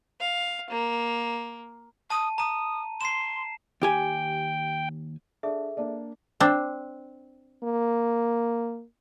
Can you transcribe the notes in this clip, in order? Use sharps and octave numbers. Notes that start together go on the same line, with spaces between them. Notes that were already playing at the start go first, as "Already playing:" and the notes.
F5
A#3
A5 D#6 D#7
A#5 D#6 D#7
C6 C7 E7
D#2 G4 G5 G#5
D4 G#4 A4 D5 E5
A#3 D4 D5
C4 D4
A#3